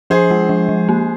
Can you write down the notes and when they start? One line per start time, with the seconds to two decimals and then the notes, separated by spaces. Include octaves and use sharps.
0.10 F3 G#4 C5
0.31 G#3
0.49 F3
0.69 F3
0.89 A#3